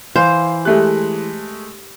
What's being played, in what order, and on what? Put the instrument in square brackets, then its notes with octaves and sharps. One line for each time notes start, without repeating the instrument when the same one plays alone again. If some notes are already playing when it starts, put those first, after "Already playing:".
[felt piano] E3 [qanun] C5 [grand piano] F5
[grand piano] G#3 A3 F#6 [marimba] G4 E5